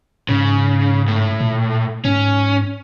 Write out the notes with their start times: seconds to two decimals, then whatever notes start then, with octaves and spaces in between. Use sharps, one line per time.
0.29 G#2 C#3
1.08 A2
1.40 A#2
2.05 G#2 C#4